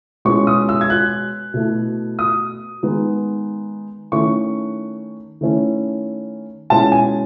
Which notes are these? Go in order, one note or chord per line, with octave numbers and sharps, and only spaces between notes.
B2 G#3 C#4 E4 C#6
D#6
E6
G#6
F#6
B2 A3 E4
D#6
D#3 G#3 B3 D#4
D#3 A3 C#4 E4 C#6
D#3 A3 C#4 E4
B2 G#3 C#4 E4 A5
G#5